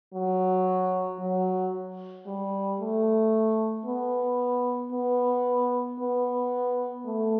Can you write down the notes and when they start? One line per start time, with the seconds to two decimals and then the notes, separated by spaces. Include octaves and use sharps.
0.14 F#3
1.20 F#3
2.27 G3
2.80 A3
3.86 B3
4.92 B3
5.99 B3
7.06 A3